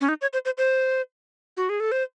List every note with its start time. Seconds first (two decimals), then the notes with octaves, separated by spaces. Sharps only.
0.01 C#4
0.09 D#4
0.21 C#5
0.33 C5
0.45 C5
0.58 C5
1.57 F#4
1.69 G#4
1.80 A4
1.92 C5